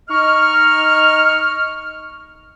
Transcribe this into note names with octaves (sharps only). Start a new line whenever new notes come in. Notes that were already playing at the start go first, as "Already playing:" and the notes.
D#4 D#5 C#6 F6